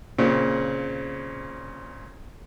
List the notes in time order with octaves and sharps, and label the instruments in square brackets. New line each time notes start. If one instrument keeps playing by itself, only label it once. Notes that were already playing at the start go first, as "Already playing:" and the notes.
[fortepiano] A#2 C#3 C4